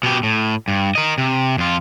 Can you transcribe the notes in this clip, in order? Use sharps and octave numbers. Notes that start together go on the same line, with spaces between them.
B2 G4
A2
G2
A#4 D#5
C3
F2 F4